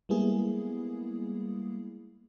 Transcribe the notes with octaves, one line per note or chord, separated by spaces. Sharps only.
G3 G#3 A#3 B3 E4 G#4